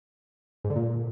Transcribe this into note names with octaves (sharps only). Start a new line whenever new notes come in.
G#2
D3
A#2